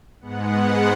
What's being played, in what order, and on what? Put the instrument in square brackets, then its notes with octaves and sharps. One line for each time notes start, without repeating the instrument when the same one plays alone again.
[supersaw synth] G#2 G#3 B3 F#5